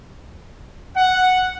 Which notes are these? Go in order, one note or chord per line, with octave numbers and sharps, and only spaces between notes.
F#5